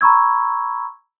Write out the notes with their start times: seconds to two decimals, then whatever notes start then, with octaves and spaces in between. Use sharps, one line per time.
0.01 A#5 B5 C#6 E6 G#6